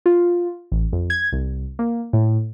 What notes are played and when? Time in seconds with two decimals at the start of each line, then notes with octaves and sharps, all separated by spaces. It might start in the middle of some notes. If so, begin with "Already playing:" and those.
0.06 F4
0.72 A1
0.93 F2
1.10 G#6
1.32 C2
1.79 A#3
2.13 A2